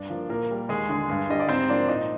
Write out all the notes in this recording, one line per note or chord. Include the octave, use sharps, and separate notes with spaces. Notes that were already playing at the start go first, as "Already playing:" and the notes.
Already playing: G2 D4 D5
F3 A#3
A#2 A#3 A#4
G3 A#3
D#2 G#3 G#4
D3 G#3
G2
D3 G3 D#5
D5
G#2 C4 C5
F3 A#3 D4 D5
A#2 D#4 D#5